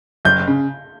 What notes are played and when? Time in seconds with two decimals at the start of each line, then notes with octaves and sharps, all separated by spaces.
0.25 F#1 G6
0.47 C#3